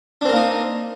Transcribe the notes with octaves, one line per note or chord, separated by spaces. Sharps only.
A#3 C4 D4 D#4 A#4